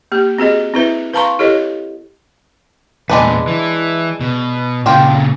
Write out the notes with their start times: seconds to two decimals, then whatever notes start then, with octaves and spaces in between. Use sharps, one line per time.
0.12 A#3 G4
0.38 C4 F#4 G#4 D#5
0.74 C4 E4 B4 E5
1.14 B4 F5 A5 A#5 C6 C#6
1.39 E4 G4 A4 C#5 D#5
3.10 E2 A#2 G#3 D4 B4
3.48 E3
4.21 B2
4.86 A#2 C#3 D4 F4 G5